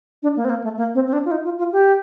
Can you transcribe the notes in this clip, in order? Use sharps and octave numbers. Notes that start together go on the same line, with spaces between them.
D4
A#3
C4
A#3
A3
A#3
C4
C4
D4
F4
D#4
F4
F4
G4